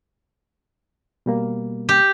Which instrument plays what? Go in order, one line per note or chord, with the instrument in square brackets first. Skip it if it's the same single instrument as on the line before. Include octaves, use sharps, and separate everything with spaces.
[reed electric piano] B2 G3 A#3
[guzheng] G4